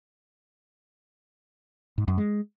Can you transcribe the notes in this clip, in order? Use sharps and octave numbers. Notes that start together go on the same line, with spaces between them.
G#2
F#2
G#3